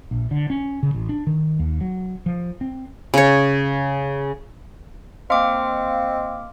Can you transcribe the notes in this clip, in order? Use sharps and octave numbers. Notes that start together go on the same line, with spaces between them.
A#1
D3
C#4
C#3
A1
D4
D#3
D#2
F#3
F3
C4
C#3 C#5
A#3 C4 D#5 F5 C6 D6 F6